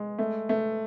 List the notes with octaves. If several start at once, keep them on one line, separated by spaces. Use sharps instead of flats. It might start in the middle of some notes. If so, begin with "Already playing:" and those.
Already playing: G#3
A3
A3